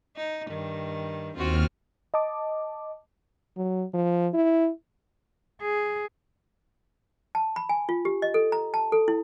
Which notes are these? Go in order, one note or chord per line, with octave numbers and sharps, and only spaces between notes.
D#4
G2 D#3
D#2 C4 F4 F#4 F6
D#5 A5 D6
F#3
F3
E4
G#4
A5
B5
G#5
F4
G4
D#5
A4
A#5
A5
A4
E4